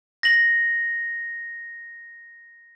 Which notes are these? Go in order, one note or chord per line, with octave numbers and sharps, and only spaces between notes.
A#6 F#7